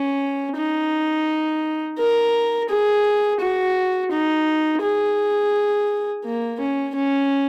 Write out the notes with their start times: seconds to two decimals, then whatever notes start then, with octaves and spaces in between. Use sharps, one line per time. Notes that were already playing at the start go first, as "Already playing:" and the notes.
Already playing: C#4
0.56 D#4
1.98 A#4
2.69 G#4
3.40 F#4
4.11 D#4
4.82 G#4
6.25 A#3
6.60 C#4
6.95 C#4